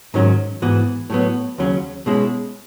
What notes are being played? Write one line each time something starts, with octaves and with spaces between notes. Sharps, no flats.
G#2 D#3 F#3 C#4
G#2 E3 B3 F#4
A2 F#3 B3
D#2 C#3 F#3 C#4
B2 G#3 C#4 E4